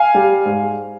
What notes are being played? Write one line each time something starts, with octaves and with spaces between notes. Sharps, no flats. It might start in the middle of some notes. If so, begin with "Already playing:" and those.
Already playing: F5 G#5
G3
G#2